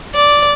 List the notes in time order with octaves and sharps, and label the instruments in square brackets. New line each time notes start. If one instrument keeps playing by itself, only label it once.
[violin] D5